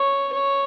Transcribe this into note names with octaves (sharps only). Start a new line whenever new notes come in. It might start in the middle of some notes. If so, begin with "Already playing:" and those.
Already playing: C#5
C#5